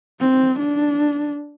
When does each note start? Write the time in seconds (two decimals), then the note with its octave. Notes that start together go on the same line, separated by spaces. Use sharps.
0.20 C4
0.59 D4